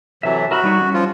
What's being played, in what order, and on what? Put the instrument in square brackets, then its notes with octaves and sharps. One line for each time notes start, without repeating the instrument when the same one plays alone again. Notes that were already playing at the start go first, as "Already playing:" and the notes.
[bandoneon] C3 E3 F#3 [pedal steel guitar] A4 E5
[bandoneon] F#4 [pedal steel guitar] A#4 E5 B5
[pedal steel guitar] G3 D#4 C#5
G3 C#4
[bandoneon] F3 F4